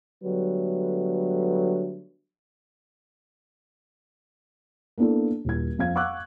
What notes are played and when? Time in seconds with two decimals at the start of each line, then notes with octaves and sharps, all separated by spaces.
0.24 D3 F#3 G3 A3 B3 B4
4.98 A#3 B3 D4 E4 A4
5.45 D#1 E4 G#6
5.78 F2 F5 G#6
5.95 F5 F#5 C#6 D6 E6 F#6